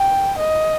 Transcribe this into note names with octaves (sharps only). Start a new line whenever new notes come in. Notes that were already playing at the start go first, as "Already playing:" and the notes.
Already playing: G5
D#5